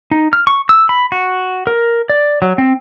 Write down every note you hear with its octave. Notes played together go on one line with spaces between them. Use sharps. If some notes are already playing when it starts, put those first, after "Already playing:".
D#4
F6
C#6
E6
B5
F#4
A#4
D5
F#3
C4